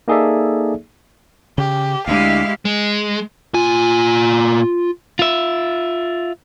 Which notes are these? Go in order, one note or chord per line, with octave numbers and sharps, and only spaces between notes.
A#3 D#4 G#4 A4 D5 E5
C#3 G4
D2 G#3 D4 E4 G4 F5
G#3
A#2 F4 G#5
F4 E5